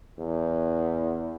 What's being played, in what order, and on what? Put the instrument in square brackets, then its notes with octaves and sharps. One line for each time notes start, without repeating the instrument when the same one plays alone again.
[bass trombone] E2